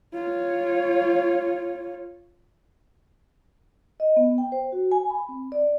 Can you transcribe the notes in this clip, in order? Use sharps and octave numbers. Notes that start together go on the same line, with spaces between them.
F4 C#5
D#5
B3
G5
C5
F#4
G#5
B5
C4
D5